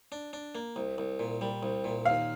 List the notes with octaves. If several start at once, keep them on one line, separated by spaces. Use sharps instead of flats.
D4
D4
A#3
C2
C2
A#2
G3
C2
A#2
D#2 F5